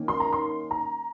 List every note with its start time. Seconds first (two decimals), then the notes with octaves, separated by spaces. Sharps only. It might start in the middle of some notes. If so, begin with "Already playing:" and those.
Already playing: D#3 A#3 C#4
0.08 C6
0.20 A#5
0.33 C6
0.71 A#5